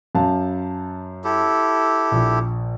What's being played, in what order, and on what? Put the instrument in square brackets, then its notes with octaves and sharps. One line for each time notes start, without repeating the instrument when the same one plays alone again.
[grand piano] F#2 F5 A5
[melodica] E4 G4 A4
[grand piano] A#1